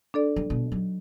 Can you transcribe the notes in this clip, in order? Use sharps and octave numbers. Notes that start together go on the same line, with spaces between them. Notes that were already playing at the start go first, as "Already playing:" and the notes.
D4 A4 D5
G3
B2 G3
F#3 D#4